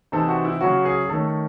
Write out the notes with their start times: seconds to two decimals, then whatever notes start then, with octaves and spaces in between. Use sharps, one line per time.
0.12 C3 E3 C4 D#4 A4
0.28 F#4
0.45 E4
0.61 C#3 F#3 C#4 F#4
0.85 G#4
1.09 D#3 A3 C#4 A4